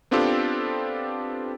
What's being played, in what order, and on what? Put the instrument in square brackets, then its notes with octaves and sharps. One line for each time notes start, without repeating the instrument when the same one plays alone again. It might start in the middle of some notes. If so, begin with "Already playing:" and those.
[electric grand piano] B3 C4 D4 F4 G4 A4